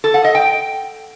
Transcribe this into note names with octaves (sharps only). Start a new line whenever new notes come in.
A4
F#5
D#5
G5